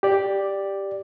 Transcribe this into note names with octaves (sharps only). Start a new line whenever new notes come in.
G4 D5